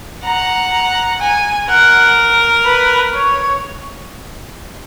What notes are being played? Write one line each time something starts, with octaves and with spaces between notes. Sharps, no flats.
F#5 A#5
A#5
G#5
A#4 F#5
B4
C#5